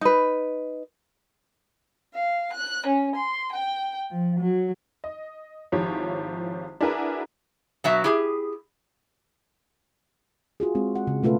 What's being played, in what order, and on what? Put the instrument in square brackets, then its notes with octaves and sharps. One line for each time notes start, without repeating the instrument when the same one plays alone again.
[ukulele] D#4 B4
[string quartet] F5
F#6
C#4
C6
G5
F3
F#3
[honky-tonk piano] D#5
G#1 F3 E4 G4 C#5
D4 E4 F#4 G#4 A#4 B4
[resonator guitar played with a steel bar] B2 F#3 E5
E4 G4 G#4
[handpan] F4 F#4 G#4
G#3 C4
F#5
C#3
B2 A3 F4 A4 B4